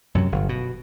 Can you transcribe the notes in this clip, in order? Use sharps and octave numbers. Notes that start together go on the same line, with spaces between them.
F#2 C3 F#3
G1
B2